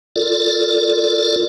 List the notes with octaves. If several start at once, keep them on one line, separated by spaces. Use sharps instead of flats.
F4 A4 A#4 D5